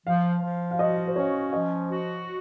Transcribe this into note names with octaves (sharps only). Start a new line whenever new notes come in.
F3 F5
F3
F5
F#4 D#5
C5
C#4 C#5
F3 D#5
F#4